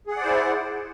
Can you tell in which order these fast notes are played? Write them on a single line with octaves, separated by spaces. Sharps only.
G#4 F#5 D5 C5 E4